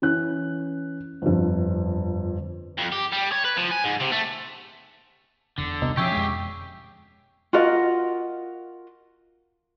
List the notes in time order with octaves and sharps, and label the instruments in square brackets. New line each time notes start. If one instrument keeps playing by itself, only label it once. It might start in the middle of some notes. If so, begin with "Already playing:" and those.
[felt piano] E3 C#4 F#6
G1 F2
[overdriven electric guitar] F2
G4
G3
C#5
B4
F3
G#5
G#2
C3
A3
[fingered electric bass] E1 [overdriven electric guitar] D3
[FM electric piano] C2 B2 D#4
[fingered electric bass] B2 F3 C#4 [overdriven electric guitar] G4 G#4 [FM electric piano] C#5 E5 D6
[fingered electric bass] F2 G#3
[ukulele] F4 F#4 A#4 D#5